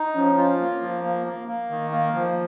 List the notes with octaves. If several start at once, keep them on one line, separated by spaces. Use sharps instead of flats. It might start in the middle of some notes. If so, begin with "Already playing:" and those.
Already playing: D#4
F3 C#4
F4
A#3
F3
A#3
A#3
A#3
D#3
A#3
F3